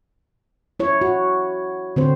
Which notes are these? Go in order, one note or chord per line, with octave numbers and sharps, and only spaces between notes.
E4 C#5
F#4
D3 C4 C5